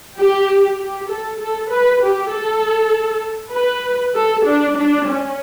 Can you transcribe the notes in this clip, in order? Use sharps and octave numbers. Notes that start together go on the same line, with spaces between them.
G4
G4
A4
A4
B4
G4
A4
B4
A4
D4
D4
C#4